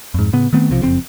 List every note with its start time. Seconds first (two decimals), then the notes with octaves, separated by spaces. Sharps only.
0.14 F2 G#2
0.33 A2 C#3 B3
0.53 D#3 A3 B3 C4
0.70 B1 C3 F3
0.82 F#1 F2 C4